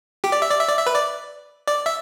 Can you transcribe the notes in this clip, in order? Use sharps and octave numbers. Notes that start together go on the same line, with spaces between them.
G4
D5
E5
D5
E5
D5
E5
B4
D5
D5
E5